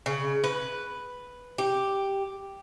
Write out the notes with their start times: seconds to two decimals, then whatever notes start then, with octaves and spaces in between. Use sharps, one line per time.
0.06 C#3
0.44 B4
1.58 G4